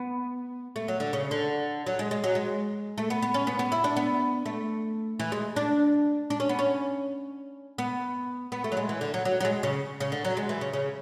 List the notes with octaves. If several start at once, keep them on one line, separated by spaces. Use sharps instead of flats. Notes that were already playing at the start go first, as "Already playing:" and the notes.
Already playing: B3
A3
F#3
D3
C#3
D3
F#3
G#3
G#3
F#3
G#3
A3
B3
B3
C#4
B3
B3
E4
D4
B3
A3
E3
G#3
D4
D4
C#4
B3
C#4
B3
B3
A3
F#3
G#3
E3
D3
F#3
F#3
F#3
G#3
C#3
C#3
D3
F#3
G#3
E3
C#3
C#3